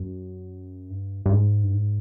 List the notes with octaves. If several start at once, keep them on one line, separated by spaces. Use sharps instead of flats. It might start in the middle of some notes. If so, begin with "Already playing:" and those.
Already playing: F#2
G2
G2
G#2
G2
G#2